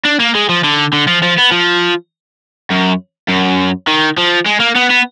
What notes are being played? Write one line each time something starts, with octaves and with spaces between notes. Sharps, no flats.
D4
A#3
G#3
F3
D3
D3
F3
F3
B3
F3
F#2
F#2
D#3
F3
G#3
A#3
B3
B3